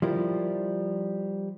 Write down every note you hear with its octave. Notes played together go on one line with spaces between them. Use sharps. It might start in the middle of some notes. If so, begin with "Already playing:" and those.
F3 G3 E4 A#4